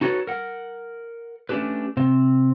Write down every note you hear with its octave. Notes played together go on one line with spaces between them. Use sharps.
D#4 F#4 A4 B4 C#5
A#4 F#5
A3 C#4 D4 G4 B4
C3 C4